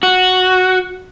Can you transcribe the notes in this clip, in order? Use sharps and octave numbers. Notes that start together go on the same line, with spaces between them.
F#4